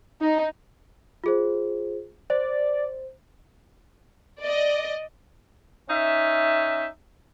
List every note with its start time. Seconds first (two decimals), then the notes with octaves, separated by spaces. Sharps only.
0.22 D#4
1.24 F4 G#4 C5
2.30 C5 D5
4.40 D5 D#5
5.90 C#4 D#4 E5